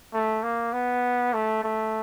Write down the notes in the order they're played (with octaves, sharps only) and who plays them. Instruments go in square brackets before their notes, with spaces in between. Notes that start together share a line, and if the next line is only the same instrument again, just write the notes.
[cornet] A3
A#3
B3
A3
A3